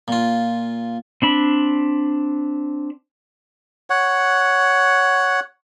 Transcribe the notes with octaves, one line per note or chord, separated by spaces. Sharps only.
A#2 F4
C4 D4 B5
C#5 F#5